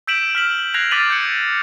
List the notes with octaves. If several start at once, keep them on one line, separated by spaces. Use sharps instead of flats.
E6 G6 B6 D7 E7 F#7
F6 B6 F#7
F#6 G#6 A#6 C7 F7
D6 F6 A6 B6 D#7 F#7
G6 C#7